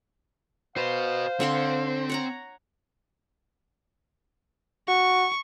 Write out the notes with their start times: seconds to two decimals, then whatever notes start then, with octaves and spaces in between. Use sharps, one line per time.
0.77 F#4 B4 C5 F5
1.40 D3 C4 C#5 C6
2.09 C#5 F#5 A#5
4.88 F#4 C#6